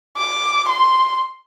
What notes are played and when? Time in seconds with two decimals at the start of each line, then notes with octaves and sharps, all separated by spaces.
0.17 D6
0.69 C6